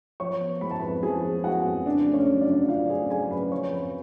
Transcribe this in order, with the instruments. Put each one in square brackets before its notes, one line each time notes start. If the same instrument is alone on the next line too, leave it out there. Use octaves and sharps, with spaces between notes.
[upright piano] F3 C#5 C#6
B3
G#3 B5
A5
F2 B4 B5
F3 G#4 G#5
B3
G#3 F#4 F#5
F2
C#3 D4 D5
A3
C#4 C#5
F#3
D4 D5
F#2
D5
C#3 F4 F5
A3 G#4 G#5
F#3 G#4 G#5
F#2 B4 B5
F3 C#5 C#6
F2 B4 B5